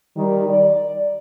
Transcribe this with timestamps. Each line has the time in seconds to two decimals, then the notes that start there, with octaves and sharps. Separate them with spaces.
0.17 D#3 G3
0.49 D5